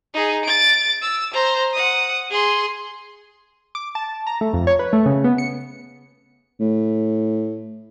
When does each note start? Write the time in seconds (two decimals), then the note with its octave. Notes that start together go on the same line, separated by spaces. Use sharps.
0.14 D#4 G#4
0.45 A6 D7
1.02 E6
1.33 C5 A#5
1.73 F#5 D#6
2.30 G#4 C6
3.75 D6
3.95 A5
4.27 A#5
4.41 A3
4.53 F2
4.67 C#5
4.79 B4
4.93 A3
5.06 C#3
5.24 B3
5.38 C#7
6.60 A2